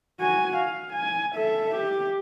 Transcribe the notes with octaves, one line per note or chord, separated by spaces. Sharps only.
F#4 G#5
F5
G#5
A4 E5
G4